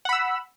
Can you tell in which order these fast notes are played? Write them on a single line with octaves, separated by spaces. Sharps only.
F#5 B5 E6